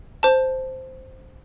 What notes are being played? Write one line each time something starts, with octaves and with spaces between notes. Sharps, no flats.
C5 A5